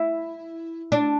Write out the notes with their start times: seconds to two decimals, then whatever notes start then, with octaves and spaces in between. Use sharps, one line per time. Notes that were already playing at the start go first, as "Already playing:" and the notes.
Already playing: E4
0.92 D4